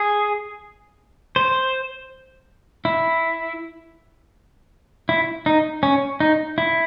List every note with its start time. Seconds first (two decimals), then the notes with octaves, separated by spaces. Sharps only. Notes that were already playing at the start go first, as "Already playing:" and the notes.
Already playing: G#4
1.36 C5
2.85 E4
5.09 E4
5.46 D#4
5.83 C#4
6.20 D#4
6.58 E4